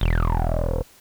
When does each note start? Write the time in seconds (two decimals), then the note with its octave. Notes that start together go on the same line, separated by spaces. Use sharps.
0.01 E1